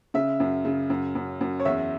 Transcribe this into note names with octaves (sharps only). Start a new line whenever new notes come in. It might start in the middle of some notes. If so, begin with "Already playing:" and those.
C#3 E5
F#2
C#3
F#2
F#2
F#2
C#5
E2 E5